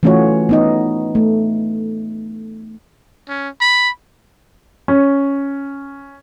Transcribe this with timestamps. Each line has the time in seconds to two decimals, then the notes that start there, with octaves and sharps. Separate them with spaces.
0.03 E3 A3 C#4 F4 F#4 C#5
0.49 B3 D#4 D#5
1.15 A3
3.29 C#4
3.61 B5
4.88 C#4